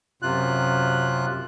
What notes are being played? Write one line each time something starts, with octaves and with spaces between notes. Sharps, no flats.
F#2 C3 F4 F#6